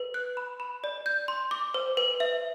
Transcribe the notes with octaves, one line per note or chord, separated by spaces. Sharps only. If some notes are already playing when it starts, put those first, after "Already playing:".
Already playing: B4
F#6
B5
B5
D5
G6
C6
D6
C5
B4
E5